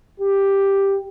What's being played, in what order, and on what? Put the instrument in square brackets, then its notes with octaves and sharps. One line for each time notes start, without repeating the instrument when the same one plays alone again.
[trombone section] G4